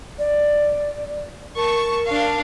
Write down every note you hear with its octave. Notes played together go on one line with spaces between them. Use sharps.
D5
A#4 A5 C#6
D4 F5